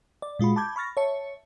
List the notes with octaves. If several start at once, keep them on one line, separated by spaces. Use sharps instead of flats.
D5
A#2 G#3 F4 F#4 B5
A5 B5 D6 G6 G#6
B5 C#6 F6 A6 A#6
C#5 E5 A5 C#7